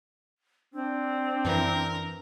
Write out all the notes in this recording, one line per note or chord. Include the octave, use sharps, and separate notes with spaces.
C4 D4
F#2 E3 A#4